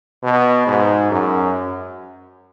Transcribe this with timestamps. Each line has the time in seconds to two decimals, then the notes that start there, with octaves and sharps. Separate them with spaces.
0.24 B2
0.67 G#2
1.11 F#2